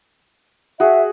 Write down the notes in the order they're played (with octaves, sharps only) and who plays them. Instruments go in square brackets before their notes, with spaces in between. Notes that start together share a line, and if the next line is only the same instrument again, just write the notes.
[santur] F#4 G#4 [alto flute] E5